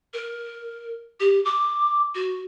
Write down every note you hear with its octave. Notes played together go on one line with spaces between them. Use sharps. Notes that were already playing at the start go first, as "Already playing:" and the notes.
A#4
G4
D6
F#4